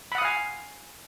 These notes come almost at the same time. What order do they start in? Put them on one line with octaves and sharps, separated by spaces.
B5 F#5 D#6 F5 G#5